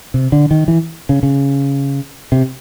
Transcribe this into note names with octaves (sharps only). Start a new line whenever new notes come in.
C3
D3
D#3
E3
C#3
C#3
C3